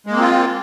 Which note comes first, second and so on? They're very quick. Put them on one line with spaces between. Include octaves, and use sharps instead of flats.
G#3 A#3 C4 F4